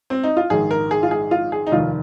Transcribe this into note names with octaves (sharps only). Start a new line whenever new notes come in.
C4
D#4
F4
A#1 G#2 D#3 G#4
A#4
G#4
F4
G#4
F4
G#4
D#4
F1 D#2 D#3 F4